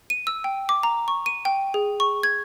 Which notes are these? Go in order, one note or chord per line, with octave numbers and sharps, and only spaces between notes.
D#7
E6
G5
D6
A#5
C#6
D#7
G5
G#4
C#6
G#6